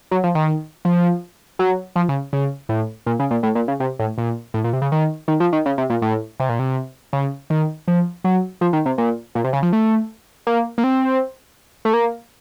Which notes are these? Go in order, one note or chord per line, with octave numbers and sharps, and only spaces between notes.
F#3
F3
D#3
F3
F#3
F3
C#3
C#3
A2
A#2
C#3
A#2
A2
A#2
C#3
C3
A2
A#2
A2
A#2
C3
C#3
D#3
D#3
F3
D#3
C#3
C3
A#2
A2
C3
A#2
C3
C#3
D#3
F3
F#3
F3
D#3
C3
A#2
A#2
C3
C#3
F3
A3
A#3
A#3
C4
A3
A#3